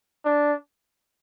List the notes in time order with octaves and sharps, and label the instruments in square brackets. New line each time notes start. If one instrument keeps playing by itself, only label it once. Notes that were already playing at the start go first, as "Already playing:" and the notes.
[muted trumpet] D4